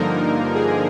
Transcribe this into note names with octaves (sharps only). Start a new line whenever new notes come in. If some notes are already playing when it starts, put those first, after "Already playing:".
Already playing: G2 D3 F3 A#3 D#4 A#4
G#4